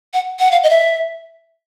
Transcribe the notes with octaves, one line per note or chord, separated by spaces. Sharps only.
F#5
F#5
F5
D#5
E5